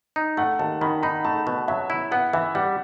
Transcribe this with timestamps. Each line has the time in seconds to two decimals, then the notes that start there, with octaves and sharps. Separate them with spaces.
0.16 D#4
0.37 A3 F#5
0.59 D#2 A5
0.81 D#3 B5
1.03 D#4 B5
1.25 A3 A5
1.47 B2
1.68 F#3 E5
1.90 E4
2.11 B3 F#5
2.33 E3 E5
2.55 G3 F#5